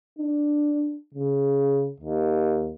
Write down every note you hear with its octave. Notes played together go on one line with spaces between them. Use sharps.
D4
C#3
D#2